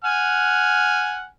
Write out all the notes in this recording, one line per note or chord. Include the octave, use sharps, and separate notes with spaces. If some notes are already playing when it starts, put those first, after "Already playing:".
F#5 G#5 F6